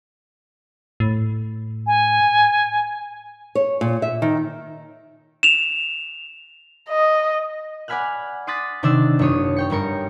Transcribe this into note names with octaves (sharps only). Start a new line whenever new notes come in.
A2
G#5
C#5
A#2
E5
D#3
E7 F7
D#5
D5 F#5 G#5 B5 F6 F#6
C6 D6 D#6 F#6 A6 B6
C3 D#3 D4 D5 E6 A6
F#1 D4 C#5 D#6
C#5 G5 C#7
G1 G3 A#4 C#7